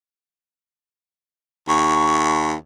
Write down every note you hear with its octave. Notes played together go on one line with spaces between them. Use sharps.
D#2 C#6